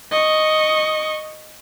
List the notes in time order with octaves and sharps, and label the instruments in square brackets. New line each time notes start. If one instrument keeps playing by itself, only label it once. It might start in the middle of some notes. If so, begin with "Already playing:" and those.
[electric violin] D#5 C#6